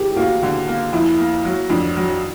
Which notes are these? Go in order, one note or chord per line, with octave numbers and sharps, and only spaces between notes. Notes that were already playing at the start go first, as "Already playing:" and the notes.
Already playing: G4 G#4
A#3 F#4
D3
A#3
F2 E4
A#3
F#3
F2 D4
F#3